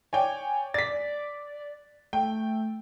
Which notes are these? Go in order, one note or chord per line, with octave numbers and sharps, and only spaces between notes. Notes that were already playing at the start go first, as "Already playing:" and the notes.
C#5 D5 G5 G#5
D5 A6 B6
A3 G5